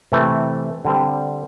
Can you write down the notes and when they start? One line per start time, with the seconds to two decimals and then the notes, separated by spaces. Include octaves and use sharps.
0.12 C3 E3 A3
0.85 D3 G3 C4